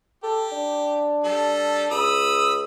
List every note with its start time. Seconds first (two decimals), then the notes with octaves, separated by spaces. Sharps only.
0.23 G4 A4
0.52 D4
1.24 G3 A4
1.91 C#2 B5 D#6 E6